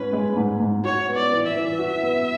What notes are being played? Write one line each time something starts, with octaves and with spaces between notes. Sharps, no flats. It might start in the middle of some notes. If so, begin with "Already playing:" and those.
Already playing: G#2 C#4 B4
G#3
G#2
G#2
F#4 C#5
B3
D5
E3
E5
E3
F#4
B3